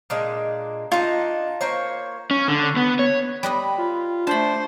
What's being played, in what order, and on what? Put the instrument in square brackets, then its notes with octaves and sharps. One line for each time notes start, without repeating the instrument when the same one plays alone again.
[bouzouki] A#2 G#3 D4
[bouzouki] D4 D#4 [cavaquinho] F4
[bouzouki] A#3 C5 C#5
[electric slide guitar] C#4
D3
B3
C#5
[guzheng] G3 B4 D#5 [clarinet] B5
[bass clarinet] F4
[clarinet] A3 [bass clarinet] D4 [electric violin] C5 [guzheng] A5 B5